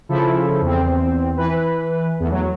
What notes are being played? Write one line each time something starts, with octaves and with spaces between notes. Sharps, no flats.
C#3 F3 E4 A4
E2 C4
E3 B4
E2 A3
F#3